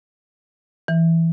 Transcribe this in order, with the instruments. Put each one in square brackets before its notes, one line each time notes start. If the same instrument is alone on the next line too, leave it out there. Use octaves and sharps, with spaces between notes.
[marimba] E3